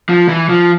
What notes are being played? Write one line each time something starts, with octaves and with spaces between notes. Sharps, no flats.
F3
E3
F3